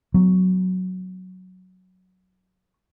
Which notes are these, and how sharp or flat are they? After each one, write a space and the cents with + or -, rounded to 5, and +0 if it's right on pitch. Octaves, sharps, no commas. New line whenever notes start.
F#3 +0 B3 +40